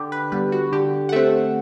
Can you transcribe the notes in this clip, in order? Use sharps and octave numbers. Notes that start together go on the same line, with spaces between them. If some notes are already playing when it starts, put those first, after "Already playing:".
Already playing: D3 G4
B4
G3 B3 B4
F#4
D3 G4
F#5
A3 C4 E5